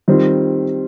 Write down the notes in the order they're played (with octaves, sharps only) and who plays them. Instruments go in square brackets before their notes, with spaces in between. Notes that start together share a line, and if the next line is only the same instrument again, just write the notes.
[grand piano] D#3 G3 C4 F4